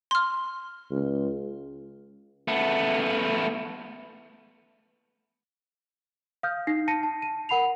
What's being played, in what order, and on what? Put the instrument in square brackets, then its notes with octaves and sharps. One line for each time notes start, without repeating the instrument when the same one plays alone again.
[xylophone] C6 F6
[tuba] C#2
[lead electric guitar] A3 B3
[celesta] F5 D#6 F6 G6
D#4 A#6 C7
A5 A#6 C#7 D#7
A5
D#7
A#4 F#5 B5 C7 F7